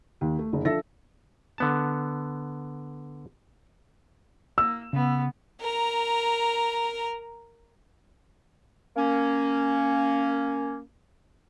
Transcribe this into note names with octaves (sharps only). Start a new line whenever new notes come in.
D#2
A3
F#1 D3
F3 D4 A4 E5 E6 A#6
D3 B3 A5
A#3 E6
C#3 B3
A#4 A#5
A#3 C#4